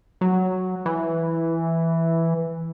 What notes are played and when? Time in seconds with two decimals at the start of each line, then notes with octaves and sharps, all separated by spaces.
0.21 F#3
0.86 E3